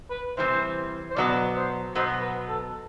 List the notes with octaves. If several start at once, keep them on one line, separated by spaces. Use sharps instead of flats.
B4
C3 E3 G3 C4 C5
C5
B2 F#3 B3 D5
C5
B2 F#3 B3 C5
B4
A4